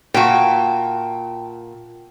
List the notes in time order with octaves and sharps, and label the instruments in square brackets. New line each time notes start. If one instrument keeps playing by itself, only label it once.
[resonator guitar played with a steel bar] A#2 F#4 [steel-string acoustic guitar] G5 A5